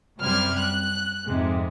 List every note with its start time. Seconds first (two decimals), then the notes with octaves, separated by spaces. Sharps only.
0.20 F#2 C3 G3 C5 F6 G#6
0.58 F#6
1.27 F2 G#2 C3 G#3